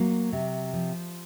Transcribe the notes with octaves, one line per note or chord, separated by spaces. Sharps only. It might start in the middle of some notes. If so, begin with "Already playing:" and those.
Already playing: F#3 A#3
C3
F3